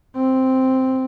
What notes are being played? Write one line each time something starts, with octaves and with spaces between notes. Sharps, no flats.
C4